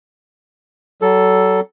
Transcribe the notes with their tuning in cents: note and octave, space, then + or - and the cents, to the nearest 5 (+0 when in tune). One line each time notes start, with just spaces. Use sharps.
F#3 +35 A4 +0